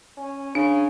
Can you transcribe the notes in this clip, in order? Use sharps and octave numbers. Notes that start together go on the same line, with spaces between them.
C#4
C#3 D4